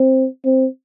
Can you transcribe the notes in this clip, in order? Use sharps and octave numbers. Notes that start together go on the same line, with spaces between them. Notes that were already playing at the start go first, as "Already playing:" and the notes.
Already playing: C4
C4